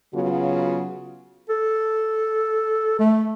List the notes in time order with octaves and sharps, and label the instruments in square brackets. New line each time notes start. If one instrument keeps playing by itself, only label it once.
[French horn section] C#3 F#3 B3 F4 F#4
[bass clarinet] A4
A3